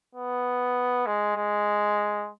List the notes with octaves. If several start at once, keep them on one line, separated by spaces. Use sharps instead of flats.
B3
G#3
G#3